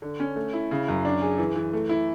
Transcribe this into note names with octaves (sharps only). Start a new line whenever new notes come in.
D3
C#4
A3
E4
C#3
F#2
D4
G#4
E3
E3
A3
E4